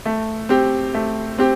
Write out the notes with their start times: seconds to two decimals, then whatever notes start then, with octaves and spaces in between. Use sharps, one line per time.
0.06 A3
0.49 C4 G4
0.94 A3
1.38 C4 G4